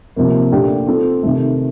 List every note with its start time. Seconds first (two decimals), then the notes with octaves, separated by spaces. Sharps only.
0.16 C3 F3 A#3
0.52 A#2 A3 D4 G4
0.87 C4 F4 A4
1.23 C3 D#3 A3